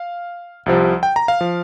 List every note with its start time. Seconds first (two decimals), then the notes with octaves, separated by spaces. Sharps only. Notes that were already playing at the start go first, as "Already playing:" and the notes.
Already playing: F5
0.66 C2 C3 F3
1.03 G5
1.16 A#5
1.28 F5
1.41 F3